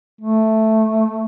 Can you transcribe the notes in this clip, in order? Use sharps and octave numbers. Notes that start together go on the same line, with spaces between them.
A3